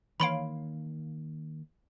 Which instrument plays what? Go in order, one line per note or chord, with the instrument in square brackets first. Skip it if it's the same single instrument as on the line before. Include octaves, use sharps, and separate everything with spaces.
[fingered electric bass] D#3 A#3 [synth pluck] E3 C#5 F5 [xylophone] B5 C6 D7